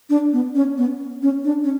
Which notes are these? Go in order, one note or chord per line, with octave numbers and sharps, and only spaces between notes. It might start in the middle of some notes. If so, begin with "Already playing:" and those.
D4
B3
C#4
B3
C#4
D4
C#4